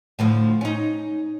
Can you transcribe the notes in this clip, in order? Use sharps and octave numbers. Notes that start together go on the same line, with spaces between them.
A2 D3 F3
C#4 D#4